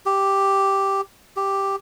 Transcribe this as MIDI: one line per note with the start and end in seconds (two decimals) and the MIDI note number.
0.06 1.01 67
1.37 1.76 67